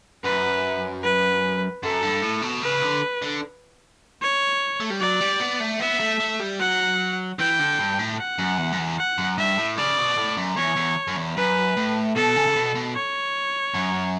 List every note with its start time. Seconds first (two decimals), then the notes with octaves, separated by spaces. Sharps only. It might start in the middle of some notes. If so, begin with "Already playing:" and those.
0.24 F#2 B4
1.04 B4
1.83 F#2 A4
2.03 G2
2.23 A2
2.42 B2
2.63 C#3 B4
2.82 D3
3.22 D3
4.22 C#5
4.80 A3
4.90 G3
5.01 F#3 D5
5.21 G3
5.40 B3
5.60 A3
5.80 B3 E5
6.00 A3
6.20 A3
6.40 G3
6.60 F#3 F#5
7.39 E3 G5
7.59 D3
7.79 G2
7.99 A2
8.19 F#5
8.38 F#2
8.58 E2
8.72 F#2
8.78 E2
8.98 F#5
9.18 F#2
9.38 G2 E5
9.58 A2
9.77 C#3 D5
9.97 B2
10.17 A2
10.37 F#2
10.57 E2 C#5
10.77 E2
11.08 F#2
11.16 E2
11.37 F#2 B4
11.76 A2
12.16 B2 A4
12.36 C#3
12.47 C#3
12.56 B2
12.75 B2
12.95 C#5
13.74 F#2